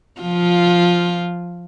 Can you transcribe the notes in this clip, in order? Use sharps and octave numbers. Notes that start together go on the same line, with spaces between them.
F3 F4